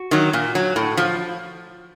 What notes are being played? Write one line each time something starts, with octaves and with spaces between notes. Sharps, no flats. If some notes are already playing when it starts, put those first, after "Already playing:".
Already playing: F#4
D#3 F#3
A#2
F#3
A2
F3